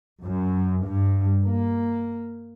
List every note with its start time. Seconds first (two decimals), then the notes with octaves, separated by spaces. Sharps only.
0.23 F#2
0.85 G2
1.44 A#3